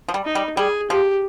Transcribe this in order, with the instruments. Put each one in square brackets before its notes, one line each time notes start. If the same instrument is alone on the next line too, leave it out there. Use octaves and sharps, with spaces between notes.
[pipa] F3
G3
[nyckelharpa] D#4
[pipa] G3
[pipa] G3 [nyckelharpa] G#4
[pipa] F3 [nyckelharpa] G4